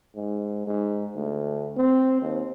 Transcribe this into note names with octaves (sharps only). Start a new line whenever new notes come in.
G#2
G#2
D2
C4
D#2